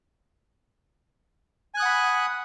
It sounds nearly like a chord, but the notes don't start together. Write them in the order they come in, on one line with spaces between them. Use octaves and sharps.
G#5 F#6 D#6 F#5 B5